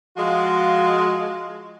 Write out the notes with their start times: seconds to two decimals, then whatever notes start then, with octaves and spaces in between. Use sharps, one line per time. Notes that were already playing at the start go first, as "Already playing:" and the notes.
0.17 F3 G#3 F4 F#4